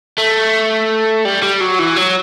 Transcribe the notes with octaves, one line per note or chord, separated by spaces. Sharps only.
A3
G3
G3
F#3
E3
F#3